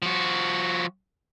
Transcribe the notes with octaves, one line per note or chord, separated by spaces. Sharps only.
F3 F#4